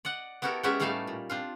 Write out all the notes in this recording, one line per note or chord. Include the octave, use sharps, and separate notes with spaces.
D5 D#5 F#5
B3 E4 F#4 G4 A4 A#4
G#3 B3 C#4 F#4 G4 E5
A2 G3 A3 D#4 F5 A5
A#2
C4 D4 F4